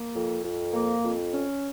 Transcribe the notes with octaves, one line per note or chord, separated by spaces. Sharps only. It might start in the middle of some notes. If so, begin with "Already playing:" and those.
Already playing: A#3
F2
F2
A#3
F2
C#4